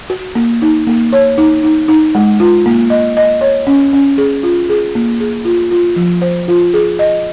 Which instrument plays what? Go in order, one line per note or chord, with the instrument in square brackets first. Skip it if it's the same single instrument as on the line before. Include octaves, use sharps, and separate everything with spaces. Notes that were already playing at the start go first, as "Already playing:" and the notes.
[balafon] F#4
A#3
D#4
A#3
C#5
D#4
D#4
D#4
G#3
F4
A#3
D#5
D#5
C#5
C#4
C#4
G#4
F4
G#4
A#3
G#4
F4
F4
F3
C5
F4
G#4
D#5